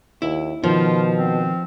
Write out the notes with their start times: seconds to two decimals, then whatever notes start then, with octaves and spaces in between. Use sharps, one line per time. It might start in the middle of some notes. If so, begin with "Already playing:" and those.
0.22 D#2 E4
0.64 B2 D#3 F3 F4
1.18 C4